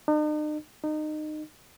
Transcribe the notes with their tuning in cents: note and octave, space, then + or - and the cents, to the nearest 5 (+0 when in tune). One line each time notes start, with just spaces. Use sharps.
D#4 -45
D#4 -25